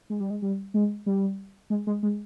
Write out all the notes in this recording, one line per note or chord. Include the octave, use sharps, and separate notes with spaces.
G#3
G3
G#3
G3
G#3
G3
G#3
G#3
G#3